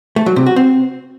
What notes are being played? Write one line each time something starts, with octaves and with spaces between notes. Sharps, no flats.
A3
F#3
C3
F#4
C4